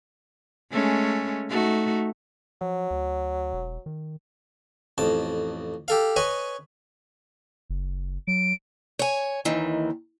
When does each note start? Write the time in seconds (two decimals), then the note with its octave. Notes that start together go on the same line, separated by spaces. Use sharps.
0.72 G#3 A3 C#4
1.50 A3 D#4 F#4
2.61 F3 F#3
2.91 D2
3.53 E1
3.86 D#3
4.98 A1 F2 A5
5.88 G4 A4 F5
6.16 B4 C#5 D#5 G#5
7.70 F#1
8.27 F#3 D7
8.99 C#5 G#5
9.45 D#2 D#3 E3